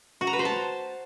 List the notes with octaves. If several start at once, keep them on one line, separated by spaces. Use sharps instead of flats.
F#4
A#5
B4
C5
A5